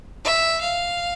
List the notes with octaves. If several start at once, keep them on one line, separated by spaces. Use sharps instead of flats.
E5
F5